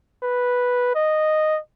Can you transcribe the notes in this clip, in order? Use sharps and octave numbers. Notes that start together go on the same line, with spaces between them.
B4
D#5